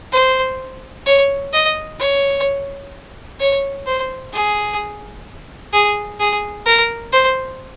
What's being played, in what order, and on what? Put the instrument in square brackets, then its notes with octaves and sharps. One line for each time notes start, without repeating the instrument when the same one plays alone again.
[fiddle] C5
C#5
D#5
C#5
C#5
C5
G#4
G#4
G#4
A#4
C5